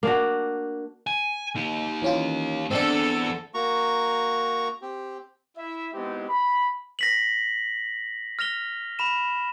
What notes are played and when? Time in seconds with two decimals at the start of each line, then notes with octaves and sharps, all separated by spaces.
0.03 A#3 D4 F#4
1.07 G#5
1.56 A#3 D#4
2.02 E3 C#4 F4
2.71 E2 G#2 C4 D4 A4
3.54 A#3 F#4 A#5 C#6
4.82 C4 G4
5.58 E4 E5
5.94 G#3 B3 C4 D#4 E4 G4
6.29 B5
6.99 A#6 B6 F#7
8.39 F6 A#6 F7 G7
8.99 B5 E7